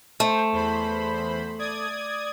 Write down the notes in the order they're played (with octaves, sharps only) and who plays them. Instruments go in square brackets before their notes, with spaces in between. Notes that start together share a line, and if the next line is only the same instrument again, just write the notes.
[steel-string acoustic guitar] A3 [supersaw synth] C5
[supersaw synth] E2 C5 B5
D5 D#6 G#6